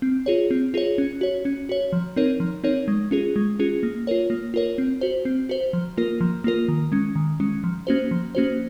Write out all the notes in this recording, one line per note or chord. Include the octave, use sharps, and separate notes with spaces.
C4
F4 G#4 C#5
C4
F4 G#4 C#5
C#4
F#4 C#5
C#4
F#4 C#5
F3
C4 D#4 A#4 C#5
F3
C4 D#4 A#4 C#5
G#3
C#4 F4 G#4
G#3
C#4 F4 G#4
A#3
F4 A#4 C#5
A#3
F4 A#4 C#5
C4
F#4 C5
C4
F#4 C5
F3
A#3 F4 A#4
F3
A#3 F4 A#4
D#3
G#3 C#4
D#3
G#3 C#4
F3
A#3 C#4 F#4 C5
F3
A#3 C#4 F#4 C5